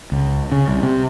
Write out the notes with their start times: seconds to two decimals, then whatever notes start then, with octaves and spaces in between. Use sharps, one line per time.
0.12 C#2
0.52 C#3
0.68 C2
0.83 C3